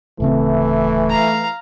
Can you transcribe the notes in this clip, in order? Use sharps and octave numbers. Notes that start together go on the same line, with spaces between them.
D1 C#3 E3 A3 C4
F5 A#5